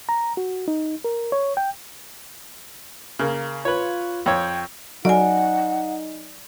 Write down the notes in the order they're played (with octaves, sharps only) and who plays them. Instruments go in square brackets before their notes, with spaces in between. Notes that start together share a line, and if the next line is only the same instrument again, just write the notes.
[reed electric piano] A#5
F#4
D#4
A#4
C#5
G5
[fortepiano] C#3 A#3
[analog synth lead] F4 [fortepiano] B4 C#5
[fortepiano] F2 C#5 [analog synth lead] G5
[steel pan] F#3 [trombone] D#4 [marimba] D5 G#5 [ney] F#5